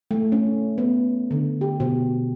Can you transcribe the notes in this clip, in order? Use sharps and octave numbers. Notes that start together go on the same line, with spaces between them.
A3
C#4
B3
D3
G4
B2